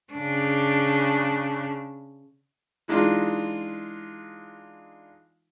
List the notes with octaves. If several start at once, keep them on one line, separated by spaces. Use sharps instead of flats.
C#3 D4
E3 G#3 D4 D#4 F4